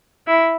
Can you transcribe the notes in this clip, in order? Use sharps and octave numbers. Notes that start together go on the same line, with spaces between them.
E4